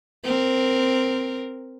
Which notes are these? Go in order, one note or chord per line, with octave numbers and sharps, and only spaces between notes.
C4 A#4